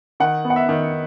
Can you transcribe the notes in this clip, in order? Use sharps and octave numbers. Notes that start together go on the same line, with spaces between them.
D#3 F#5
B3
F#5
E5
D#3